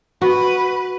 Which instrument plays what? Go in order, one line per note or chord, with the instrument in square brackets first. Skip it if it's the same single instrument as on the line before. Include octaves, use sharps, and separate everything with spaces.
[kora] F#4 [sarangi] B4